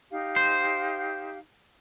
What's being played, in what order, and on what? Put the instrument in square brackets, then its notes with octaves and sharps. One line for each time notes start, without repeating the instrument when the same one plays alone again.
[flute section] D#4 G4 F5
[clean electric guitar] C5